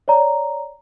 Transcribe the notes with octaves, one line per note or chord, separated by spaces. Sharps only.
C#5 D5 A#5